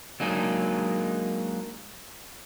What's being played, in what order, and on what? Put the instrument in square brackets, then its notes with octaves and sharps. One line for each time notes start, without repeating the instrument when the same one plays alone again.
[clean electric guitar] F#3 G#3 A#3 D4 D#4 G#4